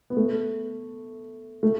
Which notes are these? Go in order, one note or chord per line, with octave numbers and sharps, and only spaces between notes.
B3
A3
A3